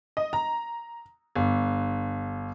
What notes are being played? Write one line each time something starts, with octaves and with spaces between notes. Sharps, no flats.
D#5
A#5
G1